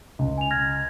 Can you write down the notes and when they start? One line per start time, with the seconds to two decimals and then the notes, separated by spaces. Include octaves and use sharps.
0.19 C#2
0.38 G#5 F7
0.51 F6 G#6 A#6